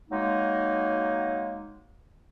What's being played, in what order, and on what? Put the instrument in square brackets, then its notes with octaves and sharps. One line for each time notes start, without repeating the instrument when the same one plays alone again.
[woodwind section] F#3 G#3 A#3 D#4